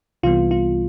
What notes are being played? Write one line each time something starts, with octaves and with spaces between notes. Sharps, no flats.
C2 C3 E3 G3 B3 F4
F4